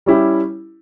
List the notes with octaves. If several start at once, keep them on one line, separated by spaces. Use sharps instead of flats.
G3 C#4 E4 G4